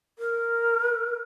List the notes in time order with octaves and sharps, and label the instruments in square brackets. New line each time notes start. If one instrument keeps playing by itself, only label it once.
[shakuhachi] A#4